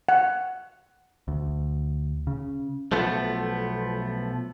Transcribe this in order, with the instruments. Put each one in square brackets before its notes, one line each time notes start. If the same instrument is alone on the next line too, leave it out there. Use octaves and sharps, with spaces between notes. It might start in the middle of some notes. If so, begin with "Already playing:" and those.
[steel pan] F#5
[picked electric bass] D2
C#3
[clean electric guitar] B1 F3 A3 B3